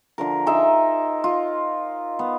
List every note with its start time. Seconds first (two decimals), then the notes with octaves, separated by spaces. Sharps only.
0.18 D3 F3 A#4
0.46 D#4 E5 G#5 C6
1.24 F4
2.19 B3